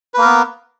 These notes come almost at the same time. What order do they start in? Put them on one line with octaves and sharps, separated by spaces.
B4 A#3 A#4 B3